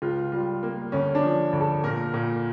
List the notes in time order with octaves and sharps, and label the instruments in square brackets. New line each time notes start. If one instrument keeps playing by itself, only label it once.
[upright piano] C#2 F4
G3 F4
A#3
D2 C#4
D4
F3
D2
A4
A#2 A#4
A#2